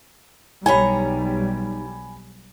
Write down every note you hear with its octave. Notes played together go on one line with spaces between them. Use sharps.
B1 G3 D#4 C#5 G#5 A#5 B5